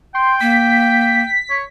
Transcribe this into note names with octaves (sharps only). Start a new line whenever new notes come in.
G5 C6
A#3 B6
C#5